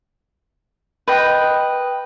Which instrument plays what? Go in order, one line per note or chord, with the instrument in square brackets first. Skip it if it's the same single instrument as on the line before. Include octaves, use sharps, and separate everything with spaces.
[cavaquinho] B4 D#5 G5